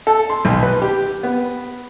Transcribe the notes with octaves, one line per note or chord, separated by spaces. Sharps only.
A4
C6
B1
B4
G4
B3